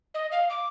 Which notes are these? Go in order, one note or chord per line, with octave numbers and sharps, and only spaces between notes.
D#5
F5
D6